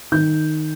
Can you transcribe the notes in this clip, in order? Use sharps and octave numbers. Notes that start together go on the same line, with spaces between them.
D#3 G6